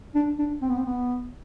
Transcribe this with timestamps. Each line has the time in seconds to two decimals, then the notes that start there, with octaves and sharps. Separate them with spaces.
0.15 D4
0.39 D4
0.62 C4
0.70 B3
0.77 C4
0.86 B3